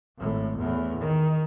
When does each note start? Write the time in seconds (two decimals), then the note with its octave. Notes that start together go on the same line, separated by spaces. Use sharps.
0.18 G#1 A2
0.57 E2 A2
0.99 D#3